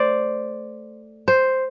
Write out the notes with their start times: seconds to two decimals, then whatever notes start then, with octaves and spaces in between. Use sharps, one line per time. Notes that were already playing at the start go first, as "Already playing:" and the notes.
Already playing: A3 C5 D5
1.28 C5